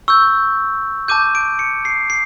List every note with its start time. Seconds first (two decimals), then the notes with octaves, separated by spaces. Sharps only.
0.08 C#6 E6 G6
1.08 A5 D6 G6 D#7
1.35 D7
1.59 C#7
1.85 C7
2.10 C7